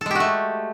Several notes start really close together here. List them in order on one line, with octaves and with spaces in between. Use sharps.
A4 G#3 G4 F#4 A3